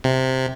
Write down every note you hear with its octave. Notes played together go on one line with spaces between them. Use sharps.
C3